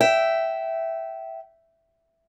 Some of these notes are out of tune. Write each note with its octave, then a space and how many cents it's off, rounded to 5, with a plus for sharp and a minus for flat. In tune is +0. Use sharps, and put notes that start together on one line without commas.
E5 +0 G5 -20